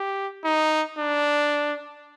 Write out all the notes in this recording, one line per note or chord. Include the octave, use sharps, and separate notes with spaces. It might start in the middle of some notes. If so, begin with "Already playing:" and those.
Already playing: G4
D#4
D4